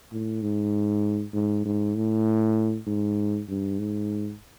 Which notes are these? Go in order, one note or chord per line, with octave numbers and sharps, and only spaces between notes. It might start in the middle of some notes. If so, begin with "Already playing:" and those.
A2
G#2
G#2
G#2
A2
G#2
G2
G#2